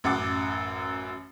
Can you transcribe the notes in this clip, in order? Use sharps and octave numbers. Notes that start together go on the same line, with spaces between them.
A1 F#2 F#5 D6